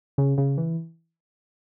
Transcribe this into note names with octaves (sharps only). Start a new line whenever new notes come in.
C#3
C#3
E3